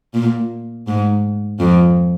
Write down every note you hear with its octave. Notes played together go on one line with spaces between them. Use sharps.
A#2
G#2
F2